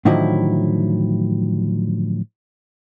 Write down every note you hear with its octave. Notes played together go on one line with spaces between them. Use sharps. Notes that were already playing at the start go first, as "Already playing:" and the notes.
A2 D3 D#3 F3 F#3 E4